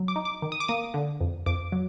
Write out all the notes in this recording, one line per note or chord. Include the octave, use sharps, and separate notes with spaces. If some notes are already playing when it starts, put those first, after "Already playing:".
Already playing: F#3
D6
D#4
D6
D#3
D#6
D6
A#3 D#6
D3
F2
F2 D6
F#3